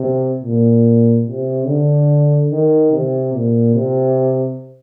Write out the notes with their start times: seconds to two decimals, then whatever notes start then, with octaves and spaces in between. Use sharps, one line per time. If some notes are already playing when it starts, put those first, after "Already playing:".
Already playing: C3
0.43 A#2
1.27 C3
1.67 D3
2.50 D#3
2.92 C3
3.33 A#2
3.74 C3